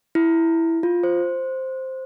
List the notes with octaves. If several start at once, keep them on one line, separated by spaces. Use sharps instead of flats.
E4
F4
C5